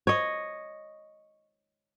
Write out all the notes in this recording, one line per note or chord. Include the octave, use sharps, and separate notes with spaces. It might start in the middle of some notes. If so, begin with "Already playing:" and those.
C#5 D#5